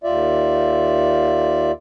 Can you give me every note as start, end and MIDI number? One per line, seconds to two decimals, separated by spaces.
0.04 1.71 39
0.04 1.71 65
0.04 1.71 74
0.04 1.71 76